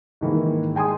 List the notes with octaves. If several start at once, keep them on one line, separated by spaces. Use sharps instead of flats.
G#2 D#3 E3 A#3
G#3 G5 G#5 C6 D#6